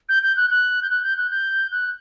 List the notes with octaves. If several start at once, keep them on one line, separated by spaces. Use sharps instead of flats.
G6
G6
F#6
F#6
G6
F#6
G6
F#6
G6
F#6